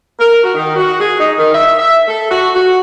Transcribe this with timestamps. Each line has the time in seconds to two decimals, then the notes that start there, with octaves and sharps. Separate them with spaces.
0.19 A#4
0.43 F#4
0.55 D#3
0.76 F#4
0.99 G#4
1.20 D#4
1.37 D#3
1.53 E5
1.78 E5
2.08 A4
2.29 F#4
2.54 F#4